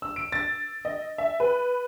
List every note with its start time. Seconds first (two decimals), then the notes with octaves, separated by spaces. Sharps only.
0.02 E6
0.16 D7
0.32 A6
0.85 D#5
1.18 E5
1.40 B4